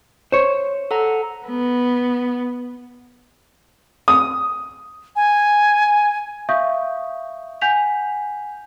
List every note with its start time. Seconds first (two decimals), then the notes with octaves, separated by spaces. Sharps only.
0.32 C5 C#5
0.91 A4 F#5 A#5
1.45 B3
4.08 D#6
5.16 G#5
6.49 E5 F5 C#6 D#6 G6
7.61 F#5 G#5 G6 B6 F7